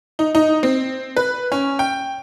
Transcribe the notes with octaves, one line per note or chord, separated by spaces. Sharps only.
D#4
D#4
C4
B4
C#4
G5